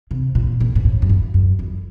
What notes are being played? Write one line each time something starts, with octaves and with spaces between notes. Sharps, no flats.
C3
A#2
A#2
G#2
A2
F#2
G2
F#2
F2